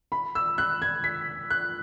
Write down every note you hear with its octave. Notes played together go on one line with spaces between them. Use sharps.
B5
E6
F#6
G#6
B6
F#6